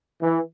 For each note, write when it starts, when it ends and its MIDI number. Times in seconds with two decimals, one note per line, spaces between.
0.22 0.41 52